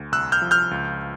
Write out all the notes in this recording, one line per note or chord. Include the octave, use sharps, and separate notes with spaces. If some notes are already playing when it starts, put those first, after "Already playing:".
Already playing: D2
C2 E6 F#6
F6 G6
F3
F6 G6
C#2